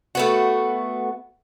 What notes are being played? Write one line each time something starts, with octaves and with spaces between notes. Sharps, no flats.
A3 B3 F#4